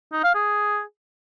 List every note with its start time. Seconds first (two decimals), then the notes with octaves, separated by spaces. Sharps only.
0.13 D#4
0.24 F5
0.35 G#4